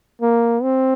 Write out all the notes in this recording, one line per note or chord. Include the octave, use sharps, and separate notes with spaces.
A#3
C4